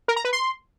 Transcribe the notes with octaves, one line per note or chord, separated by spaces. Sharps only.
A#4
A#5
B4
C6